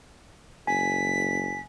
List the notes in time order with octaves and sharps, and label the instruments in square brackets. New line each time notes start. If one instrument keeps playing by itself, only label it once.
[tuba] F#1 [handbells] G#5 [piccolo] B6